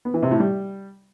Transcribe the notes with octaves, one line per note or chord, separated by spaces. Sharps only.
B3
E3
C3
A2
G3